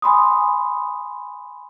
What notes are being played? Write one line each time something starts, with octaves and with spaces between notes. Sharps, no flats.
G#5 B5 C6 D#6